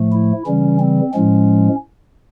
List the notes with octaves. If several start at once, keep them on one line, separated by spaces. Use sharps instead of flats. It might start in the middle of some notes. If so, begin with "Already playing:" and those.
Already playing: A2 F3 A3
E4
C#3 E3 G3 C#4
C4
A2 F3 G#3 C#4